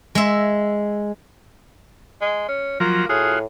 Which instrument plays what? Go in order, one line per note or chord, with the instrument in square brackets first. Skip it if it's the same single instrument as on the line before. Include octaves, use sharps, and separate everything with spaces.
[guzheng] G#3 E5
[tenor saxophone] G#3
C#4
[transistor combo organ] F3 F#3 A#5 [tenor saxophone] A#3 [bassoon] F4
[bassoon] A2 [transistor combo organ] F4 F#4 [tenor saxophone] G#4